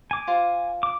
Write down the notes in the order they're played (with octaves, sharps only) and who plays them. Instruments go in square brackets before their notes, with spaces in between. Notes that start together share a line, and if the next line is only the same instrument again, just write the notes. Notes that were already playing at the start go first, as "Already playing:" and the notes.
[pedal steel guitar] G#5 D6
[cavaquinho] F4 C5
[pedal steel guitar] D6